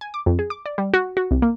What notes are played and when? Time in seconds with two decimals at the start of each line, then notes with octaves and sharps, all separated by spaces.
0.01 G#5
0.14 D6
0.26 F2
0.39 G#4
0.50 D6
0.66 D5
0.78 G3
0.94 F#4
1.17 F#4
1.31 C2
1.42 A#3